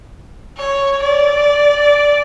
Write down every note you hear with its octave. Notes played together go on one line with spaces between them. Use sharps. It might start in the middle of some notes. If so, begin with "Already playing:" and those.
C#5
D5